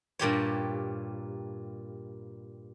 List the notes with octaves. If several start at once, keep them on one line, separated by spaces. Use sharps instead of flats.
G2 A#2 G4 C#5